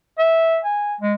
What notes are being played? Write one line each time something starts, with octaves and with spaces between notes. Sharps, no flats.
E5
G#5
G#3